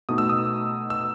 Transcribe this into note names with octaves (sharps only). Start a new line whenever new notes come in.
B2 A3 D#4 D#6
E6
D#6
E6